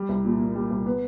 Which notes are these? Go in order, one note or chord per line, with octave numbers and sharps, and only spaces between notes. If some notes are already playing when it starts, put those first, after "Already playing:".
Already playing: G3
C2
A#2
A#3
G3
C2
B3